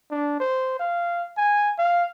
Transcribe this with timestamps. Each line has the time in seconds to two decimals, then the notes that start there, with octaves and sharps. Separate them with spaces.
0.11 D4
0.40 C5
0.80 F5
1.37 G#5
1.78 F5